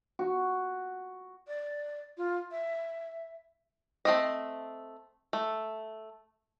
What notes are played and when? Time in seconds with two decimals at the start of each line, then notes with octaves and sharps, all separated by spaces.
0.19 F#4
1.48 D5
2.17 F4
2.51 E5
4.05 A3 C4 D#5
5.33 A3